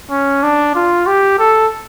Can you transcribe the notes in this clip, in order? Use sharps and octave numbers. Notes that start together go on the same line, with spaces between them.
C#4
D4
F4
G4
A4